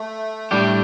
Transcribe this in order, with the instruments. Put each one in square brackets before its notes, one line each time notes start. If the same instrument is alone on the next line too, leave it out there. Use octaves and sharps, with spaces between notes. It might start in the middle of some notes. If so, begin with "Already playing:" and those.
Already playing: [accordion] A3
[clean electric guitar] A2 G3 D4 G4